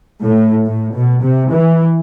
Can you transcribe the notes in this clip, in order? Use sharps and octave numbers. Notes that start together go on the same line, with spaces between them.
A2
A2
B2
C3
E3